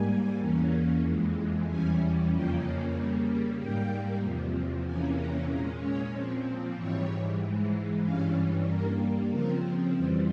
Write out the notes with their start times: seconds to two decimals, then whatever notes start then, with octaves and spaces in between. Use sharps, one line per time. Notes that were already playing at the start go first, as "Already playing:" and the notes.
Already playing: G#2 G3 A#3 G#5
0.39 E2 E3 A#3 C#4
1.02 F2 E3 G#3
1.66 E2 E3 G3 C#4 G#5
2.29 F2 C#3 F3 A#3 C#4 G5
2.94 C#3 G3 A#3
3.57 G#2 G3 A#3 G5
4.21 E2 C3 F3
4.84 E2 C3 E3 A#3 C#4 G#5
5.17 A#5
5.48 A#2 G#3 C#4 A#5
5.80 C#5
6.12 A#2 F3 C4
6.75 G#2 E3 G3 C#5
7.39 G#2 E3 G#3
8.02 G2 E3 G3 C#4 F5
8.66 G2 G3 A#3 A#4
9.29 C#3 F3 C4 A#4
9.94 F2 E3 G3 C5